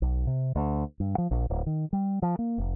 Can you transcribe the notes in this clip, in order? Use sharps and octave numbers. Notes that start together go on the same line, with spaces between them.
B1
C3
D2
G2
F3
A#1
D1
D#3
G3
F3
A#3
F1